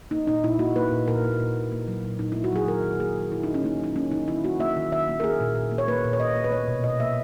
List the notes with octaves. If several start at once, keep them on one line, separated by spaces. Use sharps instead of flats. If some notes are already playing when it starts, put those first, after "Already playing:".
A#3 D#4
A#2 D#4
A#2 E4
A#3 F#4
A#3 B4
A#2
A#2 A#4
A#3
A#2
A#2
A#3
F#3
A#2
A#2 D#4
A#3 E4
F#4
F#3 G#4
D#3 A#4
D#3
A#3 G#4
F#3
D#3 E4
D#3 D#4
C#4
A#3 D#4
F#3 D#4
A#3 C#4
D#3 D#4
D#3 E4
A#3 F#4
A#3 E5
D#3
D#3 E5
A#3
A#4
A#3 G#4
A#2
A#2
A#3
C#5
A#3 B4
A#2
C#5
A#2 D#5
A#3
B4
A#3 C#5
B2
B2 D#5
A#3 E5